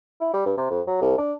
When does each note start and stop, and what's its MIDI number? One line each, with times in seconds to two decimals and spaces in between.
0.21 0.29 64
0.33 0.41 55
0.46 0.54 43
0.57 0.65 48
0.70 0.81 41
0.87 0.99 54
1.01 1.16 36
1.18 1.33 62